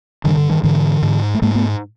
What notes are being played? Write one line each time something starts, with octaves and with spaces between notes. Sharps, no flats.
G2 D3 D#3
D3
D#3
G#2 D3 E3
G#2
A3
G#2 G#3 A#3
A3 B3